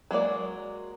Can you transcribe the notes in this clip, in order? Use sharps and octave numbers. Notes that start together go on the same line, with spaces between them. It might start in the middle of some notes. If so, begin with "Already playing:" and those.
F#3 G#3 A#3 D5